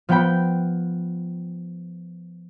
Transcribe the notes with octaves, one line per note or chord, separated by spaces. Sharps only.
F3 B3 F#5 G5 B5